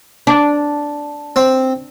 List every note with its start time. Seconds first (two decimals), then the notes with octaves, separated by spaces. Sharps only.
0.27 D4
1.36 C4